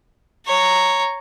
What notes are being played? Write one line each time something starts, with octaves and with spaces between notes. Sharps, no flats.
C#5 A#5